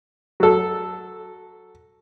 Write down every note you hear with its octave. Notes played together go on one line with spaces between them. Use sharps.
F#3 A4